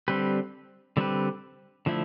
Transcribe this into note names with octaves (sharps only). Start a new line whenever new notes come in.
D3 G3 C4 G4 B4
D3 G3 C4 G4 B4
D3 F3 A3 E4